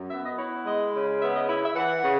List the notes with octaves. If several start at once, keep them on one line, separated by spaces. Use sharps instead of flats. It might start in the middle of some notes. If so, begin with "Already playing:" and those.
Already playing: F#2
B3 E5
D#5
E4 C#5
G#3 D#5
C#3
B3 E5
D#5
E4 E5
E5
E3 F#5
C#3